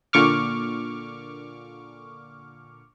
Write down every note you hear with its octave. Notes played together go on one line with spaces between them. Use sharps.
A#2 D3 C#6 D6 F6